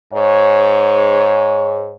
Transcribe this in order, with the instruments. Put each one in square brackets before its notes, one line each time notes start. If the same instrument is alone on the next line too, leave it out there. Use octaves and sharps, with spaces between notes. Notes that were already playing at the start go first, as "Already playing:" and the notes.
[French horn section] G#2 C#5